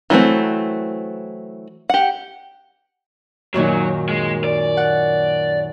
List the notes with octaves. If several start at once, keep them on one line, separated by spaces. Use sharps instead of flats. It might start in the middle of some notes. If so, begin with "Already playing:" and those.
E3 F#3 G3 A3 C4
G4 F#5
F#2 A#2 D#3 F#3
G#3
D5
F#5